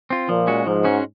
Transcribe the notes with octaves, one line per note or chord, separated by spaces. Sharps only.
C4 F4
A#2 F3
G#3 C#4 F#4
G#2 F3
G#3 C#4 F#4